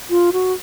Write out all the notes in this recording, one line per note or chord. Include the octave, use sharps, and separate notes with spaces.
F4
F#4